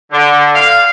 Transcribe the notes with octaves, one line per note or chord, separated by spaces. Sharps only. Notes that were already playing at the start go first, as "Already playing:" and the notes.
D3
F5